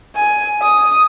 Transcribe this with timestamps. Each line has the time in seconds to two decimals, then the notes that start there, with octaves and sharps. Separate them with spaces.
0.15 G#5
0.62 D#6